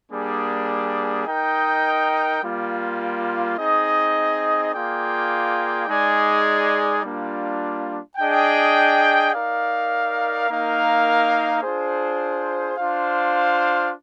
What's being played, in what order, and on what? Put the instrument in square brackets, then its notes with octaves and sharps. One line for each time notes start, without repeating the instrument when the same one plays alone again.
[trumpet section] G3 A#3 D4 G#4
D#4 A#4 D#5 G5
G3 A#3 F4
C4 D#4 G#4 D#5
A#3 F4 G#4 D5 G5
G#3 D#4 G#4 D5
G3 A#3 D4 F4
D4 G#4 D#5 G5
D#4 A#4 D5 F5
A#3 D#4 A#4 F5
D4 F4 G#4 C5
D4 F4 C5 F5